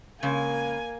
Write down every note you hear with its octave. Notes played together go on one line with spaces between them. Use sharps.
C#3 G#3 A#3 G#5